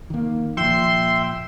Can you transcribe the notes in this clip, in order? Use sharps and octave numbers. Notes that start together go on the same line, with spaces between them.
D#3 A#3
A#2 F3 E5 G5 C6